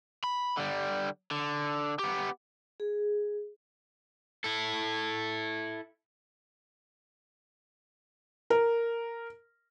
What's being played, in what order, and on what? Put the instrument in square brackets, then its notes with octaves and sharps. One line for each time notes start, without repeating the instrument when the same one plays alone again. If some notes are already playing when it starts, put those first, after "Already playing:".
[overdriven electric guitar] B5
D3 G3
D3
B3 G4
[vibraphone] G#4
[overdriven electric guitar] E4 A4
[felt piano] A#4